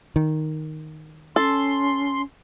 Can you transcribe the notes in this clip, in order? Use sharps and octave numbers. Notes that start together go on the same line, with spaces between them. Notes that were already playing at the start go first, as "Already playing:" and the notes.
D#3
C#4 A4 C6